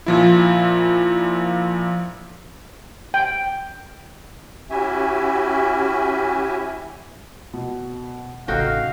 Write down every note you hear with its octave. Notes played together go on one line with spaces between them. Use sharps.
A#2 F3 E4
G5
C#4 E4 F#4 G4 E5 G#5
B2
A1 C#3 D#4 F#4 A4 F5 G5